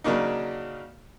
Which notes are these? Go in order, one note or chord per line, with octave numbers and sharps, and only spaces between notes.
C#3 F#3 A#3 D4 D#4